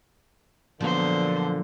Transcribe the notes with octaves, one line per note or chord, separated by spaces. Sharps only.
A#2 D3 F3 F#3 A#3 B3 C5